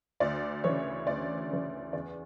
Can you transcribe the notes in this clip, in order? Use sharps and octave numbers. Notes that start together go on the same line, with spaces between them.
D2 D5
C#3 E3 C#5
D2 D5
C#3 E3
E2 D5